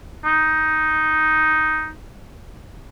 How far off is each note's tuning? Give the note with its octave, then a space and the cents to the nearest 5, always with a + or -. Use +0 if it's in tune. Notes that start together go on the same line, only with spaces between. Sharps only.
D#4 +5